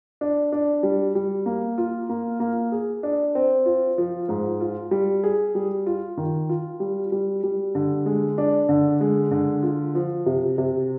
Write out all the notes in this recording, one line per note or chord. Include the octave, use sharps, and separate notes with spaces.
D4
D4
G3
G3
A#3
F4
A#3
A#3
G#4
D4
C4
F4
F3
G#2
F4
G3
G#4
G3
F4
D#3
F4
G3
G3
G3
D3
G#3
D4
D3
G#3
D3
F4
F3
C3
C3